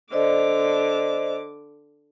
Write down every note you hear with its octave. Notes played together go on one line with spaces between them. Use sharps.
D3 C5 D5 D#5 D6